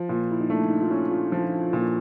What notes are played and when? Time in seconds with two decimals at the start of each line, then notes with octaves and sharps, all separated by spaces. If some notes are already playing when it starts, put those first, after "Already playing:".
Already playing: F3
0.09 A#2
0.31 E4
0.41 D#4
0.49 A3 D4
0.70 D#4
0.82 F4
0.90 C#4 E4
1.11 F4
1.32 F3
1.73 A#2